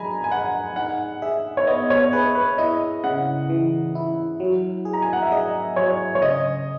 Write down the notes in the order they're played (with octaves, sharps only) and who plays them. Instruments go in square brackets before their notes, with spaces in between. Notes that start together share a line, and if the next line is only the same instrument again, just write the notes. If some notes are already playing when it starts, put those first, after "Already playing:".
Already playing: [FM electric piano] F#3 G#4 [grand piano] G#5 A#5 B5
[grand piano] G#5
[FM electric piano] G#4 [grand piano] F#5
[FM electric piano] D#4 [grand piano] F#5
[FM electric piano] G#4 [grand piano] E5
[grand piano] C#5
[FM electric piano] B3 [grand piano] D#5
[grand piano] C#5
[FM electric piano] G#4 [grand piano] B4
[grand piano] B4
[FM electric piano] E4 [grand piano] D#5
[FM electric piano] C#3 [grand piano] F#5
[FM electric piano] E3
E4
F#3
G#4
[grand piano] A#5
G#5
F#5
E5
[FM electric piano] G#4 [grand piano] D#5
[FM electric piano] F#3 [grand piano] C#5
[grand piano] C#5
[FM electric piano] C#3 [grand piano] D#5